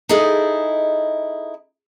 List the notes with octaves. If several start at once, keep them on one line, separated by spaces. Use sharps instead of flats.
D#4 E4 G#4 A4 D#5